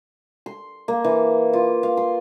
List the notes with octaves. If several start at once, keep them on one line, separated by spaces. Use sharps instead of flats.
C6
A#3
E3
F4
F5
C6